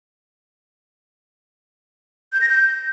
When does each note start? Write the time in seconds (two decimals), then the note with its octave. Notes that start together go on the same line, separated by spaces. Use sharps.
2.33 G6
2.41 A#6
2.49 G6